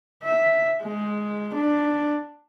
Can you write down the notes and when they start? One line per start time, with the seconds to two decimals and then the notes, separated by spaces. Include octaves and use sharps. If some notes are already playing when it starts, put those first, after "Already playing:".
0.23 E5
0.82 G#3
1.53 D4